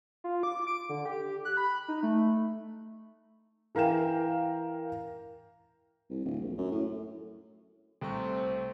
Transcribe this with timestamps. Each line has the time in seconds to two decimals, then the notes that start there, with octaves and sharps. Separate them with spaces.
0.24 F4
0.43 D6
0.67 D7
0.89 D3
1.05 G4
1.45 F#6
1.57 B5
1.88 D#4
2.03 A3
3.75 E3 A#4 F5 G5 E7
6.10 C2
6.25 D1
6.41 A#1
6.58 F#2
6.71 A2
8.01 C2 A3 C4 C#6